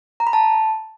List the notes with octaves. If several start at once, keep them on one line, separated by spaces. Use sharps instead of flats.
A#5
B5
A5